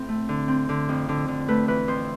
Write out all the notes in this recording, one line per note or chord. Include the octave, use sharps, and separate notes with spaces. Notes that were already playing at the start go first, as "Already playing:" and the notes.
Already playing: A2 C4
A3
D3
C4
D3
F2
D3
D3
A3 B4
E3 B4
F2 C5